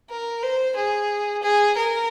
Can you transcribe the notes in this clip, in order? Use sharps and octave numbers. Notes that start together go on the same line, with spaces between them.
A#4
C5
G#4
G#4
A#4